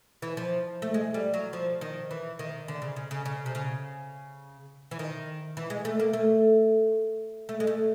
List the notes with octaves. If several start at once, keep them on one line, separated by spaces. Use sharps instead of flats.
E3
F3
A3
G#3
G3
F#3
F3
D#3
E3
D#3
D3
C#3
C#3
C#3
C#3
C3
C#3
E3
D#3
E3
G#3
A3
A#3
A3
A3
G#3
A3